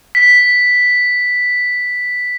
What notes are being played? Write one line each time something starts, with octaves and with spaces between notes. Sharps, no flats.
B6